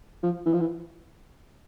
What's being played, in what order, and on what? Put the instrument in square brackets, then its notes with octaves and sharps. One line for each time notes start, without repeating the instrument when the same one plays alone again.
[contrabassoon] F3
E3
F3
E3